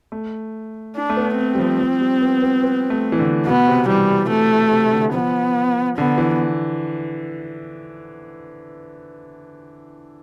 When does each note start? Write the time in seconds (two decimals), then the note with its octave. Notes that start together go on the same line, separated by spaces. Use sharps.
0.12 A3
0.96 D4
1.10 A3
1.17 B3
1.38 C4
1.54 G3
1.58 F3
1.80 F3
2.00 G3
2.21 B3
2.42 B3
2.63 B3
2.90 A3
3.12 E3
3.19 D3
3.46 B2 B3
3.68 C3
3.88 E3 G3
4.30 C3 A3
4.72 C3
4.93 D3
5.14 F3 B3
5.98 D3 B3
6.18 E3